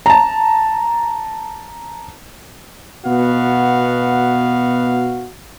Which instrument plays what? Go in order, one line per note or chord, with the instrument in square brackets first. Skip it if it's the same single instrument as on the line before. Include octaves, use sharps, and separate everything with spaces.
[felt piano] A5 A#5
[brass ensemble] B2 B3 F#4 F5